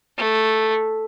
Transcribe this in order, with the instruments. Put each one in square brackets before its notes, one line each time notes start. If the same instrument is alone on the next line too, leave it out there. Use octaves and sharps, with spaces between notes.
[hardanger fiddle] A3